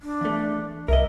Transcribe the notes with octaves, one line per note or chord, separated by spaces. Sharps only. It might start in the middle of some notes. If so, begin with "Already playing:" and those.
D4
E2 A3
C2 A#4 D#5 E5